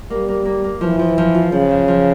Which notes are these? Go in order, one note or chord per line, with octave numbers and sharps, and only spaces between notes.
G3 A#3
A#3
A#3
A#3
E3 F3
F3
F3
F4
C#3 F3
F3
F3